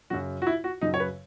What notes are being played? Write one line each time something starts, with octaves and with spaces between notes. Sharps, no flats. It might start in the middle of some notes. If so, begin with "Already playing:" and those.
F#2 C#3 F#3 F#4
F#4
E4
F#4
F#2 C#3 F#3 D#4
C#5
B4